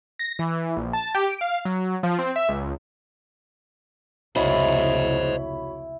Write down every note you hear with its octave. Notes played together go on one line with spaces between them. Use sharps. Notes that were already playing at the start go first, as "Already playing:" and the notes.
A#6
E3
A#1
A5
G4
D7
F5
F#3
F3
C4
E5
C#2
F1 C#2 E4 F#4 C5 C#5 D#5 B5